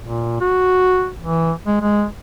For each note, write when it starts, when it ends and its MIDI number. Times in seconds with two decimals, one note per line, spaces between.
0.01 0.40 46
0.41 1.09 66
1.21 1.52 52
1.67 1.78 56
1.81 2.05 56